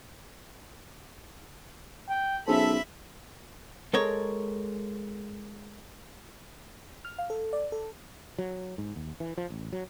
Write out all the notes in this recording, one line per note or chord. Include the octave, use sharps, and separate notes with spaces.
G5
B1 C#4 G#4 A4 C5 E5 B5
G#3 A4 A#4 C#5
F6
F5
A4
D5
A4
F#3
G#2
D#2
E3
F3
A1
F#3